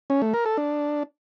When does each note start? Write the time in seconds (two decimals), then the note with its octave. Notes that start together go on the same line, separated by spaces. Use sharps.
0.10 C#4
0.22 A3
0.34 A#4
0.46 A4
0.57 D4